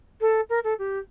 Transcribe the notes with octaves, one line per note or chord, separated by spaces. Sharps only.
A4
A#4
A4
G4